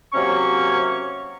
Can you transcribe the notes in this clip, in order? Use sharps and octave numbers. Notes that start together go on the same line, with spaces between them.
C3 F#3 A#3 C#4 C#6